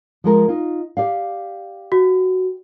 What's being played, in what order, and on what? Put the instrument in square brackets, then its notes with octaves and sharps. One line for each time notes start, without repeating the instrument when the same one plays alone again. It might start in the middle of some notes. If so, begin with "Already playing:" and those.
[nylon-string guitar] F3 G#3 A#4
D#4 F4
G4 D5 F5
[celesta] F#4